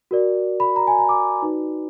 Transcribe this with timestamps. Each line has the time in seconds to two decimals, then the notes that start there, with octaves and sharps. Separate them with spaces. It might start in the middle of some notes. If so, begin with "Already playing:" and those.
0.11 F#4 A#4 D5
0.60 B5
0.76 A#5
0.87 G#5
0.98 A#5
1.09 D6
1.42 D#4 F#4 B4 D5